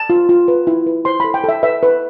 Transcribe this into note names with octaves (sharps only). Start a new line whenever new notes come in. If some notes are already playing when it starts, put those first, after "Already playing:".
Already playing: A5
F4
F4
B4
E4
B4
C5 C6
A4 B5
G5
A4 E5
B4 E5
B4